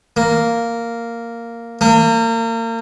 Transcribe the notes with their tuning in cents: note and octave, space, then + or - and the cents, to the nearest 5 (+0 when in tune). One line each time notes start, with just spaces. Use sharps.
A#3 -5
A#3 -35